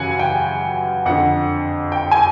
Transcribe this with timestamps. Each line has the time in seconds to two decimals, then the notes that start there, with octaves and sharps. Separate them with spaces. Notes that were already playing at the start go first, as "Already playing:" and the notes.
Already playing: F#2 C#3 E3 F#5 G#5
0.19 G5
1.06 F2 D3 F#5
1.92 G5
2.11 G#5